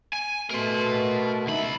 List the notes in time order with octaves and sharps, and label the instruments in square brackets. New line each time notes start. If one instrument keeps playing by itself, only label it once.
[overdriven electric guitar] G#5
[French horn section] B2 A3 [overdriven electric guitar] A#4 C6
[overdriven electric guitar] C#2 B5 [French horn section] D#4 E4